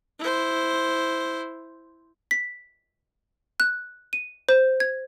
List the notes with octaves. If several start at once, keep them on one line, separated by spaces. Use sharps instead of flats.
E4 C5
B6
F#6
D#7
C5
G#6